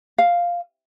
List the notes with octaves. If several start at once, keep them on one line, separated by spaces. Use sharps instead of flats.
F5